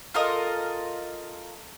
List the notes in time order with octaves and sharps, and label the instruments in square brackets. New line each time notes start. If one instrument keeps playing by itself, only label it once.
[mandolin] F4 A4 A#4 D#5